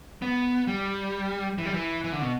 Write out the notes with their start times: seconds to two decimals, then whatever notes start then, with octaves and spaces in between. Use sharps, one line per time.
0.22 B3
0.67 G3
1.58 E3
1.66 G3
1.74 E3
2.04 E3
2.13 D3
2.22 B2